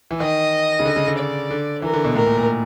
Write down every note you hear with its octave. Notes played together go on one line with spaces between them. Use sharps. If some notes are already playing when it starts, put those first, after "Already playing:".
E3
D#3 D#5
C#3
D3
C#3
D3
D5
D3
E3 A#4
D3
B2
A2 A#4
A#2
A#2